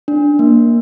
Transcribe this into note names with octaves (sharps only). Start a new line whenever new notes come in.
D4
A#3